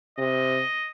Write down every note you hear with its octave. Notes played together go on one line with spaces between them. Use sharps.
C3 D#5